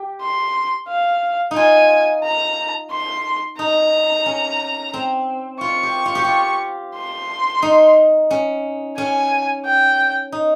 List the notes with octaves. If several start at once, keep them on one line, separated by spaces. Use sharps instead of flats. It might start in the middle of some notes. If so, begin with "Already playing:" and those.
Already playing: G4
C6
F5
D#4
F4 G#5
A#5
C6
D#4 A#5
C#4
C4
F4 C#6
G4
F4
G4
F4
C6
D#4
C#4
C#4 G#5
G5
D#4